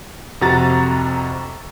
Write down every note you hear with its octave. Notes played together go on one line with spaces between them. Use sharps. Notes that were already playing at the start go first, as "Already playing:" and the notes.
F2 C3 F#4 A#5 A6